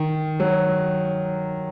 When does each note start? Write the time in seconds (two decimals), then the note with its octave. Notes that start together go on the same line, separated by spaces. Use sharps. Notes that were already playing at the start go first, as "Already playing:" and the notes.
Already playing: D#3
0.40 F#3